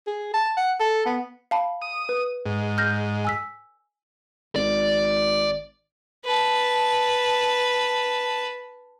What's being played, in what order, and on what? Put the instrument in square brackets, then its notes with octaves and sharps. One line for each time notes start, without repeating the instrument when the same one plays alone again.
[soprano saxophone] G#4
A5
F#5
A4
B3
[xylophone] F5 A5 B5
[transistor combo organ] D#6
[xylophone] B4
[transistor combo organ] G#2
[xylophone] F6 G6 A#6
G#5 E6 B6
[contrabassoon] G#1 [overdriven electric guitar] D5
[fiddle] B4 A5